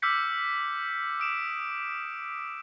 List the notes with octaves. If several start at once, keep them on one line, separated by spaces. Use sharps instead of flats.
D6 E6 F6 G6 B6 C#7
D#6 D7 E7